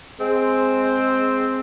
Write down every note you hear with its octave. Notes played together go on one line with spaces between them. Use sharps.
G#3 C4